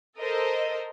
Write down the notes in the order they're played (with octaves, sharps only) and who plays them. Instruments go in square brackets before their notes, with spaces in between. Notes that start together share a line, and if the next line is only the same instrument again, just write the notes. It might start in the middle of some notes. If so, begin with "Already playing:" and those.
[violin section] A4 A#4 C5 D#5